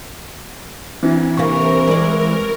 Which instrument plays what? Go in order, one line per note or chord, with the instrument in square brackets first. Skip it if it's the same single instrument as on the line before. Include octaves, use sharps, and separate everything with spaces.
[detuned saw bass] E3 [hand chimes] C4 D4 E4
[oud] C3 A#3 [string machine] A#4 [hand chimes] C#6
[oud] G#3 D5